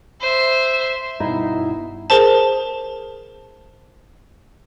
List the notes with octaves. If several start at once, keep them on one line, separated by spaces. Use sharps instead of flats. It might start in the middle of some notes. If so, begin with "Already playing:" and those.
C5 E5
G2 B2 D#4 E4
G#4 A#4 C5 A5